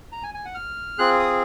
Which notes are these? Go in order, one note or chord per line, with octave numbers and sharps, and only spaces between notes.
A#5
G#5
G#5
F#5
F6
C4 F4 G#4 F#6
D#6